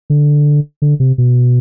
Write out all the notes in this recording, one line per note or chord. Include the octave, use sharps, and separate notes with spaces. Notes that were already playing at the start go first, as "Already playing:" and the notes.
D3
D3
C3
B2